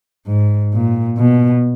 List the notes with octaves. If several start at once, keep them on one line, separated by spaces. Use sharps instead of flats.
G#2
A#2
B2